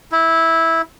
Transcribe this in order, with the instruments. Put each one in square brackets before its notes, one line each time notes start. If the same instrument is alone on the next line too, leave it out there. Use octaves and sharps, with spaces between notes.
[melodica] E4